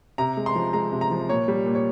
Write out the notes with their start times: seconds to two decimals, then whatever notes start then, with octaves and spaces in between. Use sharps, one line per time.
0.18 C3 A#5
0.37 G#3
0.46 C6
0.56 F3
0.73 G#3 A#5
0.92 C3
1.01 A#5
1.11 F3
1.29 A#2 C#5
1.48 G3
1.66 A#2
1.75 C#5